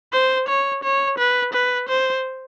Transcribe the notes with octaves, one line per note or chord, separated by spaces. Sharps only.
C5
C#5
C#5
B4
B4
C5